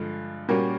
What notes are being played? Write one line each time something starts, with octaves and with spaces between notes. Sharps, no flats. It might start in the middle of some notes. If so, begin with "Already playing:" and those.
Already playing: G2 D3 F3 G#3
A#2 G3 A#3 C#4 F#4